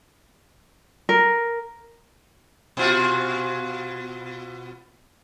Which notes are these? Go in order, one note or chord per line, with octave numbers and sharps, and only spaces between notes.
A#4
B2 F4 F#4